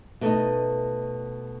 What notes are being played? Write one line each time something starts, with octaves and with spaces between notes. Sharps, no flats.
B2 A3 D#4